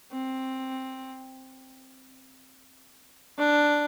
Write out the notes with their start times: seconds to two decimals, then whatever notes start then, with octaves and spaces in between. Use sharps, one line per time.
0.12 C4
3.38 D4